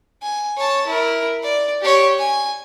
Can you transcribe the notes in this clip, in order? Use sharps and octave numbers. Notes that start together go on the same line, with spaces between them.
G#5
C#5 A5
E4 A#4
D5
G4 C#5
G#5